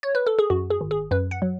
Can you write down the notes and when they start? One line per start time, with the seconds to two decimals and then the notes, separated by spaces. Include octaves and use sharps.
0.03 C#5
0.15 B4
0.27 A4
0.39 G#4
0.50 F#2 F#4
0.70 G#4
0.81 G#1
0.91 G#4
1.11 F#2 B4
1.31 F#5
1.42 F#3